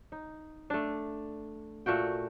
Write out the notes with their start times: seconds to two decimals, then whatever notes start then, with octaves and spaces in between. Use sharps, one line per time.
0.12 D#4
0.70 A3 D4
1.86 A#2 A3 F#4 G5